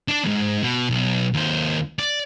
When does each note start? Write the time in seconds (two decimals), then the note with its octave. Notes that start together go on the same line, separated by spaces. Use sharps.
0.08 D4 D5
0.24 E2 G#2
0.63 B2
0.90 B1
1.34 D#2 C5
1.99 D5